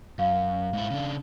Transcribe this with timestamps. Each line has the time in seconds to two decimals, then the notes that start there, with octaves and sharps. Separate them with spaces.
0.19 F#2 F5
0.73 G#2 E4
0.91 C#3 D4